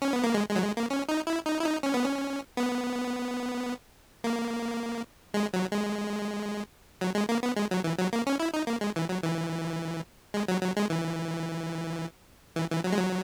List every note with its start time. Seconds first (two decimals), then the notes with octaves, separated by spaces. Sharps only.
0.02 C#4
0.13 B3
0.24 A#3
0.34 G#3
0.49 G#3
0.56 F#3
0.62 G#3
0.77 A#3
0.90 C#4
1.08 D#4
1.27 E4
1.46 D#4
1.60 E4
1.65 D#4
1.83 C#4
1.94 B3
2.04 C#4
2.57 B3
4.24 A#3
5.34 G#3
5.53 F#3
5.72 G#3
7.01 F#3
7.15 G#3
7.29 A#3
7.43 B3
7.56 G#3
7.71 F#3
7.84 E3
7.98 F#3
8.13 A#3
8.27 C#4
8.40 E4
8.53 D#4
8.67 A#3
8.81 G#3
8.96 E3
9.09 F#3
9.23 E3
10.34 G#3
10.48 F#3
10.62 F#3
10.77 G#3
10.90 E3
12.56 E3
12.71 E3
12.84 F#3
12.92 G#3
12.98 F#3